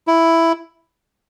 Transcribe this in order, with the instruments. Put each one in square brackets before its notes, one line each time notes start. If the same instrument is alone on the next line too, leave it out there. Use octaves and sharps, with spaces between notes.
[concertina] E4